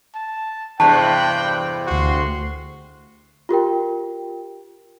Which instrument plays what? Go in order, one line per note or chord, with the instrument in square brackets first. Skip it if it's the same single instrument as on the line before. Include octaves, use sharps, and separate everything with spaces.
[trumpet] A5
[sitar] E2 G2 C3 [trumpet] G5 [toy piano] A5 [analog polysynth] F#6
[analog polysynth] D2 C6 [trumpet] F#4
[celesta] F4 G4 A#4 G5